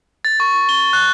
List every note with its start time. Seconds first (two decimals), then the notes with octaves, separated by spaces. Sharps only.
0.25 A6
0.40 C#6
0.69 G7
0.93 F#6